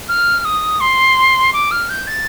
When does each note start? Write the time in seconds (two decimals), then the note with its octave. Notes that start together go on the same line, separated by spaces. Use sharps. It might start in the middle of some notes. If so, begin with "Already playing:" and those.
0.09 F6
0.45 D#6
0.80 C6
1.53 D6
1.71 F6
1.89 G6
2.07 A6